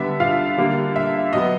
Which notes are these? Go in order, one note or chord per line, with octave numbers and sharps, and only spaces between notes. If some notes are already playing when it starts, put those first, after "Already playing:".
Already playing: D3 G3 B3 E5
F4 F5
D3 G3 A#3
E5
B2 F#3 B3 D#5